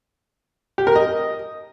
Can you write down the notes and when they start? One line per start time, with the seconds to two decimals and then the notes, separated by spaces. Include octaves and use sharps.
0.78 G4
0.87 A#4
0.96 D#5